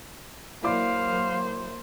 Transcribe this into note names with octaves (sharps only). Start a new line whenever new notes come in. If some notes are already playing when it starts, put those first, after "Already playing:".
F#3 A#3 E4 C5 D5 F5 D6